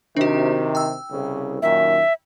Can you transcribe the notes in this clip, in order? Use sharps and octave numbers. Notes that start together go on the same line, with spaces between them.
C3 D#3 D4 F#4
G5 E6
C2 C#3
F#2 A#2 D#3 E5